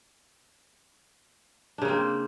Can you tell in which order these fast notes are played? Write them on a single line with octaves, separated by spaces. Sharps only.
D4 C#3 A#3 C4